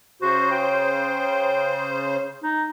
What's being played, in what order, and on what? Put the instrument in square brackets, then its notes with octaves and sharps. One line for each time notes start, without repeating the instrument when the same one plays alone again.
[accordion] C#3 C5 [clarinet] F#4
[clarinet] G5
D#4